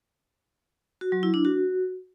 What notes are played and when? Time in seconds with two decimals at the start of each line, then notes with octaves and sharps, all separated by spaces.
1.01 F#4
1.12 F#3
1.23 E4
1.34 D4
1.45 F#4